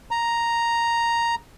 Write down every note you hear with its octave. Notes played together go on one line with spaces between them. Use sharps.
A#5